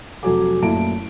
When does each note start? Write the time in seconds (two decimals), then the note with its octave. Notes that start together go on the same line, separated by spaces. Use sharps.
0.23 F1 F#3 F#4 A4 G#5 D6
0.62 F#2 A#2 A3 E4 A5 D7